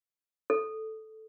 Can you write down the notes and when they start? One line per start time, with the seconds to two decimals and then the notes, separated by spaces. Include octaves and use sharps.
0.50 A4